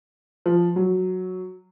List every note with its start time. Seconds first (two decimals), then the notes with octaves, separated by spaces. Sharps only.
0.46 F3
0.76 F#3